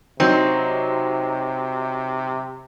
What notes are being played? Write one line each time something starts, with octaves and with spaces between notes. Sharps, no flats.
C3 F#3 C4 D#4